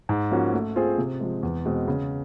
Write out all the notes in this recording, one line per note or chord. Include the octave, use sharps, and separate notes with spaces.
G#2
F3 A#3 C#4 F#4
A3
C4 F4 G#4 C5
C3
F3 G#3
E2
B2 G#3 C4
C#3